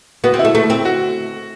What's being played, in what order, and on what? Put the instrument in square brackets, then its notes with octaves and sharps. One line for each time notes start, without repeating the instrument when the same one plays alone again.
[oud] B3 [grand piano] F#4
[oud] C4
[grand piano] E4
[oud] A3
A3
C4
[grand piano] F#4